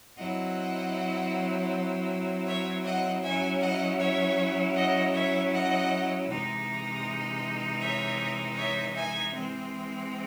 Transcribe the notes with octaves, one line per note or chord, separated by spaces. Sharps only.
F#3 C4 E4 D#5 F#5
C#5 E5
D#5 F#5
F#3 C#4 E4 E5 G#5
D#5 F#5
C#5 E5
D#5 F#5
C#5 E5
D#5 F#5
C3 E3 G#3 D#4
C#5 E5
C#5 E5
E5 G#5
E3 G#3 C4